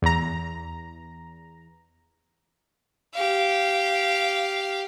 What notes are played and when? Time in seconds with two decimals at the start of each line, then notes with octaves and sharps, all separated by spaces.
0.02 E2 A#5
3.14 G4 F5